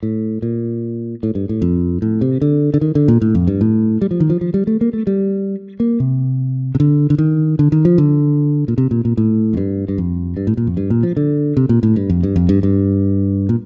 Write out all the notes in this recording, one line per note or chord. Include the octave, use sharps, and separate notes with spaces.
A2
A#2
A2
G2
A2
F2
A2
C3
D3
D3
D#3
D3
A#2
A2
F2
G2
A2
G3
F3
D#3
F3
F3
G3
A3
A#3
A3
G3
A#3
C3
C3
D3
D3
D#3
D3
D#3
F3
D3
A#2
C3
A#2
A#2
A2
F2
G2
G2
F2
G2
A2
A#2
F2
G2
A#2
F3
D3
C3
A#2
A2
G2
F2
G2
F2
G2
G2
A#2